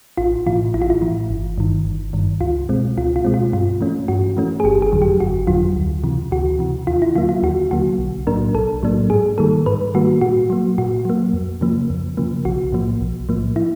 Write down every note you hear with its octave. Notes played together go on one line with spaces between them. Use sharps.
A1 F4
A2 E3 F4
A1 E4
F4
E4
A2 E3
G1
G2 D#3
G1
G2 D#3
C#2 F4
B2 G#3 C4
C#2 F4
F4
B2 G#3 C4
F4
G2 F4
E3 A3 C#4
G2 F#4
E3 A3 C#4
G#4
G1 G4
G#4
F2 D3 F#3
G4
G1 F#4
F2 D3 F#3 F4
D2
C3 E3
D2 F#4
C3 E3
D#2 F4
E4
D3 F#3 A#3 F4
F4
D#2 F#4
D3 F#3 A#3 F#4
B1
A2 F#3 A#3 D4 A#4
B1 A4
A2 F#3 A#3 D4
G#2 G#4
D#3 G3 A#3 A4
G#2 B4
D#3 G3 A#3 F#4
A#2 F#4
F#3 A#3
A#2 F#4
F#3 A#3
F2
C#3 F3 A#3
F2
C#3 F3 A#3
B1 F#4
A2 F3 A#3
B1
A2 F3 A#3
E4